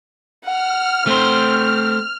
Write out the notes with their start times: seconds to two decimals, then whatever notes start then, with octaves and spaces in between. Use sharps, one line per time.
0.44 F#5 F6
1.07 A3 C4 C5